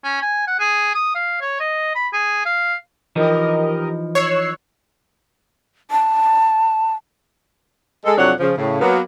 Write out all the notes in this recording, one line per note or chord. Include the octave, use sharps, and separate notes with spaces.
C#4
G#5
F#5
G#4
D#6
F5
C#5
D#5
B5
G#4
F5
E3 F3 D#4 G4 A#4 D#5
C#5 E6 F#6 C7
A5
G#3 A4
F2 C3 F#3 D4 C#5 F#5
C#3 F3
A2 C#3
F#3 A#3 B3